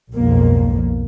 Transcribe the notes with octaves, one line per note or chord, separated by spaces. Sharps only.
B1 F2 G#2 A#3